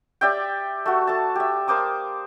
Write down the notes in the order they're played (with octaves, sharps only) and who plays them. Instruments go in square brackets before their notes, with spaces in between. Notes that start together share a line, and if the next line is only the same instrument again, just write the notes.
[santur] G4 D5 E5 G5
A3 F#4
A4 A5
G4 E5
A#3 C5 D6 D#6